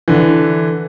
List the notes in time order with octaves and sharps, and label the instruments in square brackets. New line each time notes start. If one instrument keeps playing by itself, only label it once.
[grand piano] D3 E3